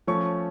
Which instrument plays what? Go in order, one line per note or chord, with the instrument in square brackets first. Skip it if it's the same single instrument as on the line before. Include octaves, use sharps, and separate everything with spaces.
[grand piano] F3 A3 C#4 C#6